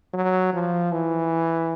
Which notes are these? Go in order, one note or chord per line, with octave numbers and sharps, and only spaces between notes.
F#3
F3
E3